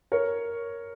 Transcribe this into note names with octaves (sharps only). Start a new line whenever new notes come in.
A#4 C#5